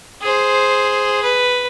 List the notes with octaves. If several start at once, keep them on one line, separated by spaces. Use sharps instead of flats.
G#4 C5
B4